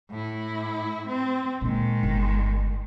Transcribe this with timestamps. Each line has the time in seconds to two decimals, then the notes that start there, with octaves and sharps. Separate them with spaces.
0.11 A2 E4
1.07 C4
1.61 A#2 D3 D#3 G#3
2.03 G1